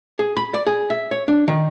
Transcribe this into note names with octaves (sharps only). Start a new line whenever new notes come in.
G#4
B5
D5
G#4
E5
C#5
D4
D#3